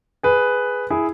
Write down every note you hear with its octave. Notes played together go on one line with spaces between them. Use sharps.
G#4 B4
E4 G#4